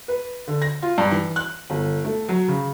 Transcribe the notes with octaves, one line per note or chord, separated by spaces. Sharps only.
B4
D3
A#6
F4
G2
E3
F#6
G1
A3
F#3
C#3